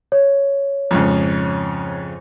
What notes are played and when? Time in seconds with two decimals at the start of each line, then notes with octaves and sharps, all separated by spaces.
0.12 C#5
0.91 F2 G#2 C#3